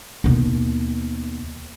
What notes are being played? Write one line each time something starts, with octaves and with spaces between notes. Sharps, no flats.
D#2 B2